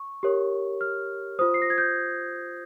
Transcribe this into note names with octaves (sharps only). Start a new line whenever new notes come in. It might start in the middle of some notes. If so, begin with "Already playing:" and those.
Already playing: C#6
G4 A#4 C#5
F6
F4 C5 D#6
C7
A#6
G#6
G6